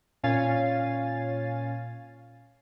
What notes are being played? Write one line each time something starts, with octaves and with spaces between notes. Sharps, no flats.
A#2 C#4 C#5 F5 G#5 A6